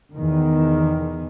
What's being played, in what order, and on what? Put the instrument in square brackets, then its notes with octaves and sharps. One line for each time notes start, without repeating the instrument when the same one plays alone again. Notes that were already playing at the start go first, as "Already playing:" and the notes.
[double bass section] E2 D#3